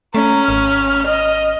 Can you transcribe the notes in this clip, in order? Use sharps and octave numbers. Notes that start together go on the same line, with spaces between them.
A3 C#4 A#5
G#1 F6
D#5